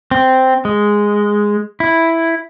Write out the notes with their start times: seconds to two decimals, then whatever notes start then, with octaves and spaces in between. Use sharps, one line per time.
0.11 C4
0.65 G#3
1.80 E4